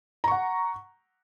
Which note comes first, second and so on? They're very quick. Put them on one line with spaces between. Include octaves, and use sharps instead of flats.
A#5 C#6 F#5